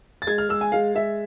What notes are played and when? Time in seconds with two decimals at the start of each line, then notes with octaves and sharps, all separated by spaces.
0.22 A6
0.27 G#3 G#6
0.38 F6
0.49 G#3 E6
0.61 G#5
0.72 G#3 F5
0.95 G#3 E5